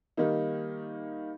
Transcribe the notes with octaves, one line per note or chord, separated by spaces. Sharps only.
D#3 G3 A#3 D#4